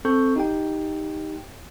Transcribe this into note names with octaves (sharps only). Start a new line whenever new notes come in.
C4 A4 C#6 G6
D#4 G4 G5